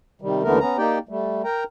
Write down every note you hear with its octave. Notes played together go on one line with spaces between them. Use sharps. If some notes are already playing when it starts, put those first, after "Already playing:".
C3 D#3 G3
D#2 D3 E3 A3 B3 A#4
B3 C#4 A#5
A#3 D#4 G4 D5 G5
G3 A3
A#4 G5 A#5